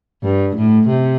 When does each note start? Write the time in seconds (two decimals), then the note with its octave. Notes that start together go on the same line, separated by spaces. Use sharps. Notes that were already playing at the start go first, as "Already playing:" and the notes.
0.23 G2
0.56 A2
0.88 C3